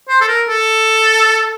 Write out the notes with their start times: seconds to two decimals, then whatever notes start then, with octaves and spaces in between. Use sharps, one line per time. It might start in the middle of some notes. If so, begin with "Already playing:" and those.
0.09 C5
0.21 A4
0.28 A#4
0.48 A4